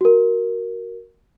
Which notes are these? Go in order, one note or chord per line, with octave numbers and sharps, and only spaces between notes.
F#4 A#4